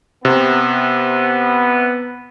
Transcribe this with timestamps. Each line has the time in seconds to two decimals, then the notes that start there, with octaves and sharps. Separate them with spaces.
0.25 C3 B3